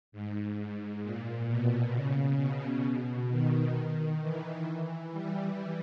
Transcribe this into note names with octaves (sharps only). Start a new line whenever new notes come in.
G#2
A#2
B2
C#3
B2
D#3
E3
E3
G3